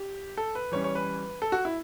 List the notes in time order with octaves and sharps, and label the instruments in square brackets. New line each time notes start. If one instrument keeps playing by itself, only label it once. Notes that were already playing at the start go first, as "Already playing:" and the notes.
Already playing: [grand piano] G4
A4
B4
E3 G3 C#4 C#5
C#5
B4
A4
F#4
E4